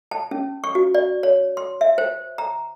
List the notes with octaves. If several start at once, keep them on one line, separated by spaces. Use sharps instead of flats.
A5
C#4
C#6
F#4
D5
C#5
C6
E5
C5
A#5